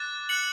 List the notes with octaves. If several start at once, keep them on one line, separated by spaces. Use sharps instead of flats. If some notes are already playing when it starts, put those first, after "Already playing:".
Already playing: D6 F#6 A6
F#6 C#7 F#7